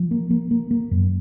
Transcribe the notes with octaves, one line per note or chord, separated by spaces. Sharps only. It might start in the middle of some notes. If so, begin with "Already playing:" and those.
Already playing: F3
A#3
A#3
A#3
A#3
F#2